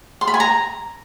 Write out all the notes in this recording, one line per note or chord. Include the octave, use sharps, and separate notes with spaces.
C6
B5
G#5
A#5